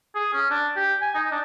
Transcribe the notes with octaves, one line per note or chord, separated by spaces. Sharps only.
G#4
C#4
D4
G4
G#5
D#4
D4